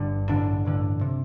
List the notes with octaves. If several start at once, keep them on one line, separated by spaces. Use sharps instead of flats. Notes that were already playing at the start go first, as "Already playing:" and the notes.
Already playing: G1 G2 D3
A1 G2 D3 D4
A1 G2 D3
C3